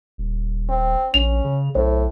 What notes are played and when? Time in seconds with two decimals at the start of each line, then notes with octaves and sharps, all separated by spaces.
0.18 D#1
0.69 C4
1.14 A#1 C#4 F7
1.44 C#3
1.75 B1 A2 C5